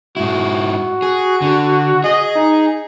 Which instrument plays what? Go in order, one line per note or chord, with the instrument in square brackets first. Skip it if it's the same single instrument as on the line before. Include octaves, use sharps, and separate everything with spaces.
[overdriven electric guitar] G#2 E4 [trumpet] F#4
[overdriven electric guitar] G#4
D3
[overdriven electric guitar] G#4 [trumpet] D#5
[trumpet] D#4